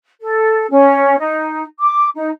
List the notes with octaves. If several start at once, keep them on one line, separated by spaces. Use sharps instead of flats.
A4
C#4
D#4
D6
D#4